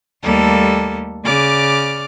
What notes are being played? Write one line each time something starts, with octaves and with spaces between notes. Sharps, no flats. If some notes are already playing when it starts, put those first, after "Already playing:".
D#2 G3 A3 A#3 A4
C#3 D5 D6 F6